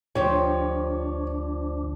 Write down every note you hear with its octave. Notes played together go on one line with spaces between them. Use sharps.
D2 F3 D4 G4 C#5